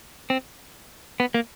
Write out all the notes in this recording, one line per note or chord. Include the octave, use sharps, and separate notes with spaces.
C4
B3
A#3